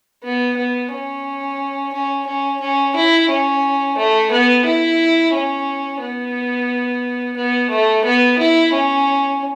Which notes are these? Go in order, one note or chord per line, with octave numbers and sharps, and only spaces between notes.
B3
B3
C#4
C#4
C#4
C#4
E4
C#4
A3
B3
E4
C#4
B3
B3
A3
B3
E4
C#4